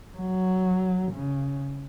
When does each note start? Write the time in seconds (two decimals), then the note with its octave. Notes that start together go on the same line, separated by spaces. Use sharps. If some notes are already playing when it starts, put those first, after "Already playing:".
0.17 F#3
1.12 C#3